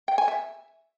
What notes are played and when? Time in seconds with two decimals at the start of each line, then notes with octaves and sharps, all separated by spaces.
0.08 G5
0.18 G#5
0.28 E5